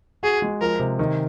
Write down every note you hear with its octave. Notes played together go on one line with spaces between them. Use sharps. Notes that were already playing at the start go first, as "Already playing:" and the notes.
F#4 G#4
G#3
F3 A#4
C3
D#3